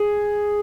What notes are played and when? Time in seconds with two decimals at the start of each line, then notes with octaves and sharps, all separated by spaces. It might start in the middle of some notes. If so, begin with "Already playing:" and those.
Already playing: G#4